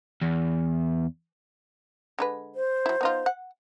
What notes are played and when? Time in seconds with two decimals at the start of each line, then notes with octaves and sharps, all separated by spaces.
0.21 E2
2.19 D3 G#3 B4
2.55 C5
2.86 F#3 E4
3.01 B3 D#4 F4
3.26 F#5